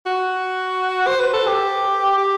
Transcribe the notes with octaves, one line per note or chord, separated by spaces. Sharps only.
F#4
C5
B4
A4
G4
G4